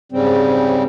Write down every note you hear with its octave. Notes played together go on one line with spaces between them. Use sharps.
G#2 C#3 G3 C4